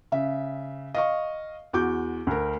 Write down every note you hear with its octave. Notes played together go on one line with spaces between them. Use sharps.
C#3 E5
D#5 F5 C#6
E2 F#4 D6 G6
D2 A#4